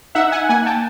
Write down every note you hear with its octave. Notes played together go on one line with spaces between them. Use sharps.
D#4 E5 F#5
F#5 G#5
A#3 F#5 G#5
G5 A5